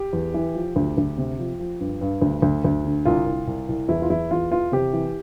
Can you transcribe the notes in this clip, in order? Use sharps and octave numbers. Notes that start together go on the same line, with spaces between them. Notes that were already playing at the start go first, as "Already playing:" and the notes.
Already playing: G4
E2
E3
F3
D2
D2
C3
F3
F3
G2
G2
D2
D2
D2
D3
C2 F4
C2
C2
C2
E2 E4
F4
E2 E4
E2 F4
E3 F4
C3 G4
E3